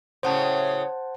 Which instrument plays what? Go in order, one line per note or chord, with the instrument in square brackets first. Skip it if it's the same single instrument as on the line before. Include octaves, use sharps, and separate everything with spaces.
[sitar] A2 C#3 F#3 [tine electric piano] C5 F#5 A5